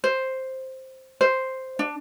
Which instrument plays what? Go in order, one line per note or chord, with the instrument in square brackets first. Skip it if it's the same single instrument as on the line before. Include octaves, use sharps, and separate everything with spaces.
[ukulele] C5
C5
D4